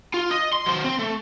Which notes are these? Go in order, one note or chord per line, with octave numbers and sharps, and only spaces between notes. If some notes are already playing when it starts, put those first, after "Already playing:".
F4
D#5
C6
F#3 C5
C4
A3